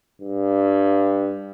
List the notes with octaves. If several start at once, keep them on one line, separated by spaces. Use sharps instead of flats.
G2